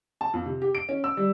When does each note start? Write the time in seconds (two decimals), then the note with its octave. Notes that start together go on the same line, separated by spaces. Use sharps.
0.21 A5
0.33 F2
0.46 C3
0.62 G4
0.75 D7
0.89 C#4
1.04 E6
1.17 G3